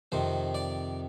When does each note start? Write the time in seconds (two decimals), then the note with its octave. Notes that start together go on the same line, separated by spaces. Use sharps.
0.12 F2 C3 D#3 C5
0.55 D5